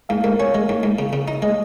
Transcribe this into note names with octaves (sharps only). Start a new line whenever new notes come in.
G#2 F5
G#2 A#4
C#4 C#5
G#3
G#2
G#2
C#3
C#3
D#4
G#3 D#5